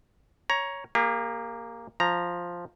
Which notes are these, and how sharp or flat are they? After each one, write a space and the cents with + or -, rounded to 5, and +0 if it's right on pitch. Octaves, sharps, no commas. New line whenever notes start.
C#5 +0 A#5 +15
A#3 +0 G4 +45
F3 +0 A#5 +0